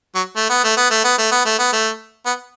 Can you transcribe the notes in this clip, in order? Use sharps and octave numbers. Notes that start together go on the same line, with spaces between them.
F#3
A3
B3
A3
B3
A3
B3
A3
B3
A3
B3
A3
B3